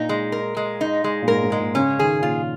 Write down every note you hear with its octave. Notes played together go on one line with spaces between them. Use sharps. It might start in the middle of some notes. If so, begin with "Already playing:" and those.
Already playing: A#2 D#4
G#3
A#4
G#3
D#4
G#3
A#2
G#2 A#4
G#2
G#3
A#2
C#3 C#4
D#3 G#4
A#2 F4